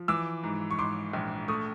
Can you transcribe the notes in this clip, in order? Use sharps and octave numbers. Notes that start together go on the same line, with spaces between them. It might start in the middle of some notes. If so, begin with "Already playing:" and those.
Already playing: F3
E3 D6 E6
G#2
C#6
G#2 C6 D6
A#1
A3 C#6 D#6